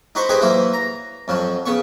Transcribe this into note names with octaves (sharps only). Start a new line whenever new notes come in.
D#4 F#4 C5 B5 C#6
D#4 G4 G#4 B4 C5
E3 F#3 A#3 C5
A#5
F2 F3 F#3
C#3 B3 C#6